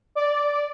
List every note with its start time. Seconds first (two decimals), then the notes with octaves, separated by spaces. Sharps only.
0.15 D5